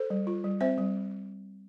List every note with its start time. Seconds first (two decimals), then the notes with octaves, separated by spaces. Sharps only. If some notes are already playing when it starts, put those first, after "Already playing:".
Already playing: A4 C5
0.10 G3
0.27 F4
0.44 G3
0.61 C4 C5 E5
0.78 G3